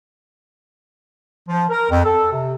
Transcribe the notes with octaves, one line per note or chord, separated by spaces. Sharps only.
F3
A#4
F2
A4
C3